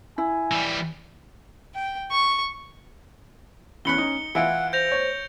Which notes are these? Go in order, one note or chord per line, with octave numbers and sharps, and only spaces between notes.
E4 G#5
E3 G3
G5
C#6
E2 C#4 B5 F#6 C#7 G7
D#4
E3 E4 F4 F#5 C#7 D7
C5 G6 A#6 F7
C#5